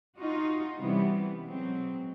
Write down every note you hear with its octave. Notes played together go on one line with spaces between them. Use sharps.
D#4 F4 F#4
C3 E3 G3 B3 C#4
B2 F#3 G#3 C4